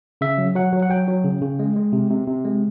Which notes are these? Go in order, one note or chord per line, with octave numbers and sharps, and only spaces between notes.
C#3 E5
F#3
F#3 F#5
F#3
F#5
F#3 G5
F#3
C#3
C#3
G#3
G#3
C3
C3
C3
G#3